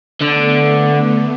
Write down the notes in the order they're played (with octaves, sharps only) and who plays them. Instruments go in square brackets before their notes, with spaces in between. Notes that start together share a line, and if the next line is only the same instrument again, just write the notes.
[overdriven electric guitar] D3 [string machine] A3 B3